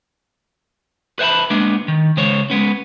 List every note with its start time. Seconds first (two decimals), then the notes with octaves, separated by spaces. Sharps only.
1.19 B4 C5 E5 F#5 A5 B5
1.50 G#3 A#3 B3 D4
1.88 D#3
2.17 C#3 G#3 C5 C#5
2.50 G#3 B3 C#4